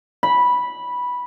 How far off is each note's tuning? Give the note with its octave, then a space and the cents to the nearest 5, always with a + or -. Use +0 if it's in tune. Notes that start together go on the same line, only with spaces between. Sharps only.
B5 -10